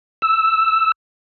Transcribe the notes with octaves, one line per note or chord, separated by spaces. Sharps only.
E6